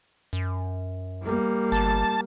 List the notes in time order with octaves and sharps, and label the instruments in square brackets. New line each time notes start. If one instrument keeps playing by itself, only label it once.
[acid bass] F#2
[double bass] G3 A#3
[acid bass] G1 [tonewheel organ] A5